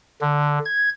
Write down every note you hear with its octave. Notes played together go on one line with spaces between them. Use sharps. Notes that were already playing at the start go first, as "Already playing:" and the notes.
D3
G#6